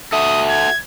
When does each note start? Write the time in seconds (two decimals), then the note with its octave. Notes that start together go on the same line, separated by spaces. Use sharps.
0.13 F#4 A4 E5 D#6
0.49 G#6